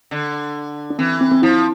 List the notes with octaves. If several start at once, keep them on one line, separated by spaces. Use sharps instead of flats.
D3
D4
E3 C4
C4
C4
F3 E4